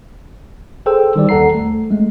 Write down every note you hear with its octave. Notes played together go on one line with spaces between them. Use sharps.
G#4 A4 C5 G5 E6
D#3 G3 C5 D5
D#2 A4 F#5 A#5 C7
A3
G#3 A3